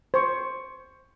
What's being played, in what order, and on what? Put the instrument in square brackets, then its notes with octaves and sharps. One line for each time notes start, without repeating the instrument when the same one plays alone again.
[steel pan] C5 C#6